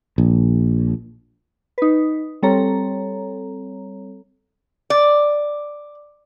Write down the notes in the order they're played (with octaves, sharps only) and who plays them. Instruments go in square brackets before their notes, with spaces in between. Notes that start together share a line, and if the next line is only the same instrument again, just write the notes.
[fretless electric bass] A#1
[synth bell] D#4 B4
G3 C4 A4 C#5 A#5
[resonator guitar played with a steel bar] D5